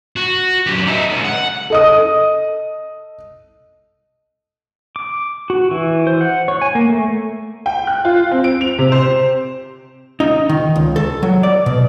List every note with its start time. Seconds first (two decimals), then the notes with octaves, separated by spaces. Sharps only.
0.16 F#4
0.67 F#2 G4
0.86 D#4 E5
1.09 C#2 C#3
1.24 F#5
1.70 A4 D#5 D#6
4.96 D6
5.50 F#4
5.71 E3
6.07 C5
6.21 F#5
6.48 C#5
6.62 G#5
6.75 A#3
6.89 A3
7.66 G5
7.87 F#6
8.05 F4
8.31 C4
8.44 D7
8.61 F7
8.78 C3
8.92 C5
10.20 D#4
10.49 D#3
10.76 C#2
10.96 A4
11.23 F#3
11.43 D5
11.66 B2